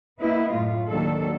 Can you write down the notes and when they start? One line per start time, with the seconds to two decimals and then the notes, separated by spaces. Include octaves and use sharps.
0.19 A#3 B3 E4 B4 D#5
0.52 F#2 A2 A3 F4
0.87 D#2 D#3 F#3 D4 A4